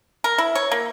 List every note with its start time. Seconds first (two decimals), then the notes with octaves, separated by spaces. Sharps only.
0.24 A#4
0.38 E4
0.55 C#5
0.72 A#3